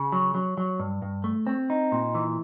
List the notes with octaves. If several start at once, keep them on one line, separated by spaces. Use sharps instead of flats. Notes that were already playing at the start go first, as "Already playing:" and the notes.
Already playing: C#3
F#3
F#3
F#3
G2
G2
A3
C4
D#4
A#2
E3